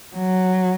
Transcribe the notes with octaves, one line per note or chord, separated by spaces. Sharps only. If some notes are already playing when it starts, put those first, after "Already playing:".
F#3